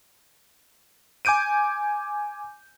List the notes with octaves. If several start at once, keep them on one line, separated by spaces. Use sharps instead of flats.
G#5 D6 G6 D7 D#7